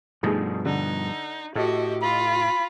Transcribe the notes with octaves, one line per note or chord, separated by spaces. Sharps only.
G2 B2 F3 A3 D#4 G#4
D3 D#4
A2 F#4 G4 A4 D#5
F4 B5